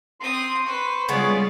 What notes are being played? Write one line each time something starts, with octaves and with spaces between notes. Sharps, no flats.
C4 C6 D#6
B4 C5 C#6
C#3 G3 G#3 B3 F4 D5